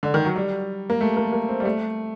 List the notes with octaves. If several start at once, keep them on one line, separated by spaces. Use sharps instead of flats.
D3
D#3
F#3
G3
A#3
A3
A#3
A#3
C4
G3
A3